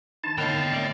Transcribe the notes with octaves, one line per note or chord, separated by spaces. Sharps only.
D#3 D4 D#4 A5
D3 B3 C#5 D#5 F5 G5
A3 C4 D5